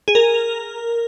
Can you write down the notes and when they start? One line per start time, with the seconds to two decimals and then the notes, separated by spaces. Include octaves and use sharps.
0.08 G#4
0.15 A#4